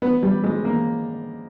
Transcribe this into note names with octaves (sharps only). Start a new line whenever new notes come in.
B3
G3
G#3
A#3